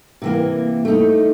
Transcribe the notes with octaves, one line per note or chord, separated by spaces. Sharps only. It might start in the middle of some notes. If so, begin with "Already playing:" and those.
C3 E3 A#3
A3 D#4